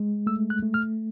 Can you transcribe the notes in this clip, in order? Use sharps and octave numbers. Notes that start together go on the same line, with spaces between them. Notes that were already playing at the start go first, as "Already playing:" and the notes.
Already playing: G#3
A3 E6
F#6
A3
F6